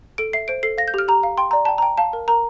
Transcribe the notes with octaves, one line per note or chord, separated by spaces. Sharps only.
A4 D7
E5 C7
C5 D7
A4 C7
F5 A#6
G6
G4 F6
G4 A#5
F5
G5 C6
D5 A#5
G5 A5
G5 A#5
F5 A5
A#4
A#4 A#5